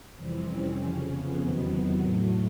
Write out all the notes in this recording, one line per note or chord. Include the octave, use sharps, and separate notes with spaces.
F2 C3 E3 G3 C4
C#4
F2 C#3 F3
B3
E2 C3 D#3 F#3
A2 F#3 A3